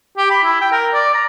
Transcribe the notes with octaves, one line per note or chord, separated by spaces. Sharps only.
G4
B5
E4
G5
A#4
D5
A#5